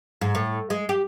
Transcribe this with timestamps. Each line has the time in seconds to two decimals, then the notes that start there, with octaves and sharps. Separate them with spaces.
0.21 G#2
0.35 A2
0.70 G#3
0.89 G4